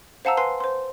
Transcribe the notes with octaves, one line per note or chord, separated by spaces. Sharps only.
C5 F5 F#5 A5 A#5 E6
B4 G#5 C6 C7
C5 C6